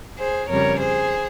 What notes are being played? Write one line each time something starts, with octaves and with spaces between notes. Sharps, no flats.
G#4 C5
F2 C#3 G3 A#4 C#5
G#4 C5